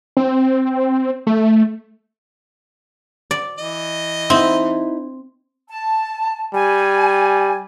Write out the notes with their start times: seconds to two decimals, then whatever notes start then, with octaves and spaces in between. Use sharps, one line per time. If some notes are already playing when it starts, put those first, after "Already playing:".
0.17 C4
1.27 A3
3.31 D5
3.58 E3 D#5
4.30 C4 D#4 E4
5.68 A5
6.54 G3 G#5